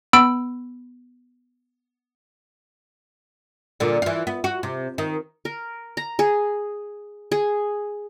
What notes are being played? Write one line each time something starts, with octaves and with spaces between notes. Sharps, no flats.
B3 B5 E6 D7
A#2 D3
E3 F4
B3
F#4
C3
D#3
A#4
A#5
G#4
G#4